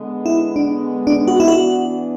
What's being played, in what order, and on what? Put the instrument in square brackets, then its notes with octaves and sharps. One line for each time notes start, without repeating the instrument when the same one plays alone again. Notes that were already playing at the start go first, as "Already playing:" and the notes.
Already playing: [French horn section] D3 G#3 B3
[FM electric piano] E4
D4
D4
F#4
E4
[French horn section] E3 B3 D4 [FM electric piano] F#4